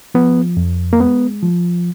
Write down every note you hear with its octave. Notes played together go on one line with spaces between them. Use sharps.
F3 B3
F2
A#3
G#3 B3
F3